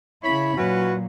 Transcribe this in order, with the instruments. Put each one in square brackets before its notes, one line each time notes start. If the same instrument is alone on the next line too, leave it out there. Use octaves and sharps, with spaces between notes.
[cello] C#3 E4 [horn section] C#5 B5
[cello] A#2 F#3 [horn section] C#4 E4 B4 [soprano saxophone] F#4